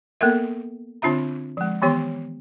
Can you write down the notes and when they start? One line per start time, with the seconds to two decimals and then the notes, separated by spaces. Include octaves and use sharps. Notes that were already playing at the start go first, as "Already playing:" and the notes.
0.21 A#3 B3 A4 A#4 E5
1.02 D3 C4 D4 F4 E5 A#5
1.57 F3 G#3
1.82 D#3 E3 B3 G4 C#5 C6